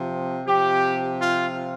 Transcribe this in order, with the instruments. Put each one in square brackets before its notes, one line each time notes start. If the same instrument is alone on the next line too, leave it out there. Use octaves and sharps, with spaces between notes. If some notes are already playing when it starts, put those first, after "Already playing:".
Already playing: [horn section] C3 F3
C3 F3 G4
F4